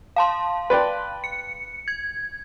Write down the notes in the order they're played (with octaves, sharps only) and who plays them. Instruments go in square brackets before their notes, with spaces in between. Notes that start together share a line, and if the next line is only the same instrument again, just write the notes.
[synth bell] F5 A5 C6
[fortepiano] B4 D5 G5
[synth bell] C#7
G#6